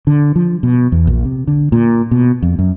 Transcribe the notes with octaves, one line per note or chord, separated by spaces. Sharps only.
D3
F3
B2
E2
A#1
C3
D3
A#2
B2
F2
F#2